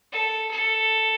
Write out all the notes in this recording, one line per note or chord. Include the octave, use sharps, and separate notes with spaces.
A4
A4